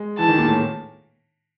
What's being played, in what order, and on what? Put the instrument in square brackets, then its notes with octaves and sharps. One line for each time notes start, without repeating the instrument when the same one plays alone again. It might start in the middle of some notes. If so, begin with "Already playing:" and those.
Already playing: [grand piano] G#3
[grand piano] E3 [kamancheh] A5
[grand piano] D#3
A#2
A2